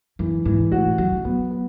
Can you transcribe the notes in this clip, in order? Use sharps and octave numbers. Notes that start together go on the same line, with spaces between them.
F#2 E3
G#2 E3
A2 F#4
F#3 F#4
E3
F#3 B3
B3